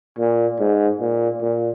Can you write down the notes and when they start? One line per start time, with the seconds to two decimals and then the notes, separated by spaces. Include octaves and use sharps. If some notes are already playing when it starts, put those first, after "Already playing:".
0.19 A#2
0.60 G#2
1.01 A#2
1.42 A#2